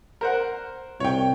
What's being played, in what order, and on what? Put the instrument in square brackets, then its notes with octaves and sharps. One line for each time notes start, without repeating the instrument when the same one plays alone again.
[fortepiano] A#4 C5 F#5
[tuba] C2 [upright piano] C#5 G5